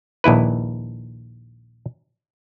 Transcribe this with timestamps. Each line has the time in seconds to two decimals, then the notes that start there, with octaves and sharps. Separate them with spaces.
0.24 A#1 D#2 E4 B4